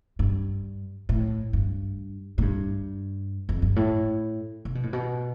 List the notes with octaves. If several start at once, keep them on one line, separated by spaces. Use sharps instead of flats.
G2
A2
G2
A2
G2
F2
G2
A2
C3
B2
A2
B2